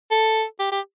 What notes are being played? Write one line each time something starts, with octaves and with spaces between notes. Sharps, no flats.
A4
G4
G4